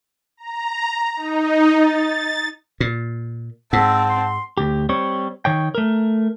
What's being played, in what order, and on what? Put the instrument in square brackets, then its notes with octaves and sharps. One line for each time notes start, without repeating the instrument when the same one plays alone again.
[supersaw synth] A#5
D#4
A6
[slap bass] A#2
[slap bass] G#2 [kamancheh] C4 A5 [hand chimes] F#5 [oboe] E6
[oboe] C6
[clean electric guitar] D2 G4
G3 C4 C#5
D#3 C#5 G5
A3 A#4